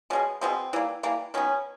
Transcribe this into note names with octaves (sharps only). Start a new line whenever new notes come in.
B2 G#3 B3 C#4
B2 G#3 B3 C4
E3 G3 A#3
E3 G3 A#3
D#3 F#3 B3 C#4